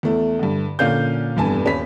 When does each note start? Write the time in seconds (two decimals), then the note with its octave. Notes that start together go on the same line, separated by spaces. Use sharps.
0.03 E2 A3
0.39 G2 D3
0.79 A#2 D3 C#4 F5 G6
1.37 F1 E2 G2 G#5 A5
1.65 D#1 C#4 B5 B6